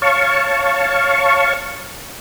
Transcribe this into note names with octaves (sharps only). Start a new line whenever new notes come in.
C#5 F5 A5 C#6